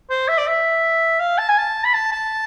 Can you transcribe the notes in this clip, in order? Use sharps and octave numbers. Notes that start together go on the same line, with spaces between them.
C5
E5
D5
E5
F5
A5
G#5
A5
B5
A5
A5